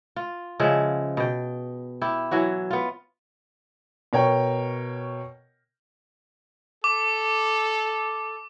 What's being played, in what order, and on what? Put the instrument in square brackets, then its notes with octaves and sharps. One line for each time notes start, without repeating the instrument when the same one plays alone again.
[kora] F4
C#3 F3 G#3 E5
B2 G5
E4 G4
E3 F#3 F#4
B3 F4
[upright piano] B2 A#4 C#5 G5
[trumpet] A4 [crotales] D6